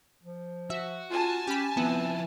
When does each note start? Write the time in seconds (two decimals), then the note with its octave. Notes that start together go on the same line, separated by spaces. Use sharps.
0.23 F3
0.70 F#4 E5
1.11 F4 G#5 A5
1.47 C#4 G4 B5
1.77 F3 B3 C4 E4